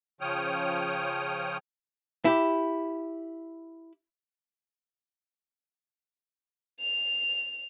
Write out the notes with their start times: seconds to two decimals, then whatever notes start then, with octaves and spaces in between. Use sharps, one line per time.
0.21 C#3 F3 C#5 G5 D#6 F6
2.25 E4 G4
6.80 F7